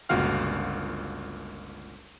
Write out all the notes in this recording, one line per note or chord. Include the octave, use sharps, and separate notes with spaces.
G1 C#2 A#2 F#4 F5 F6